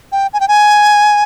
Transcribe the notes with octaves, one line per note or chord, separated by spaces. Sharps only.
G5
G#5
G5
G#5